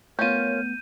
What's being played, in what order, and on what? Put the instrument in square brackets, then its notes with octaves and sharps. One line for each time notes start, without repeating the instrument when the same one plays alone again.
[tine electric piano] A3 B3 [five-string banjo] C#4 F4 [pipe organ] A#4 C#5 [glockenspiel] G6 D#7